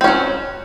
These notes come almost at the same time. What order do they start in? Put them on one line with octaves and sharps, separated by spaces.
C4 C#4 F#3